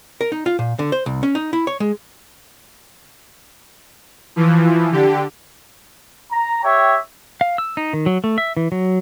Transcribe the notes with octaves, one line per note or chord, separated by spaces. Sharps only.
A#4
D#4
F4
A#2
D3
C5
C2
C#4
D#4
E4
C#5
G#3
E3 F3
D3 G4
A#5
G4 C#5 E5 G5
F5
E6
D#4
D#3
F#3
A3
E5
E3
F#3